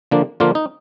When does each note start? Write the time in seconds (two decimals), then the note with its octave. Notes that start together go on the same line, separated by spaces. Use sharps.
0.11 D3 F3 A#3 D4
0.40 D3 F3 A#3 D4 F4
0.55 D#4